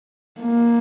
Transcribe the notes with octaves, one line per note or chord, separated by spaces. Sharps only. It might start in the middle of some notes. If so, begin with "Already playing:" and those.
A#3